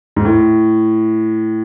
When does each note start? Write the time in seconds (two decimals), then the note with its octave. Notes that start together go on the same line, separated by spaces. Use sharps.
0.16 G#2
0.25 A2